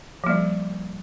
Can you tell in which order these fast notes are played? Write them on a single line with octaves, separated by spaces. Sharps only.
F3 A#3 G3